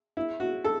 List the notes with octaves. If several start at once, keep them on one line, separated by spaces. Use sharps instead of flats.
E4
F#4
A4